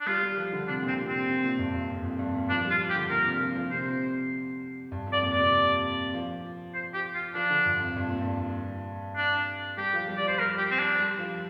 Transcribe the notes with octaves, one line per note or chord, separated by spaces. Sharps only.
D4
G3 F4
G3
F3
D3
C3 D4
A#2
C4
C3
C4
C3
A#2
G2
G2
F2
F2
G2
A#2
F3 D4
G3
F4
F3
G4
D3
A#2 A#4
C3
F3
F3
C3 C5
G2
F2
D5
A#2
C3 D5
F3
C5
G4
F4
F3 D4
D3
G2
F2
G2
A#2
G2
D4
G3 G4
F3
G3
D5
F3
C5
G3 A#4
G4
C4
D4
G3
F3